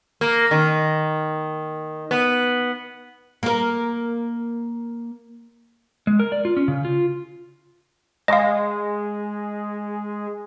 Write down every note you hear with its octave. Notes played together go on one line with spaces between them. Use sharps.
A#3
D#3
B3
A#3 A#4
G#3
A#4
D5
F4
C#4
C#3
F4
G#3 D#5 F5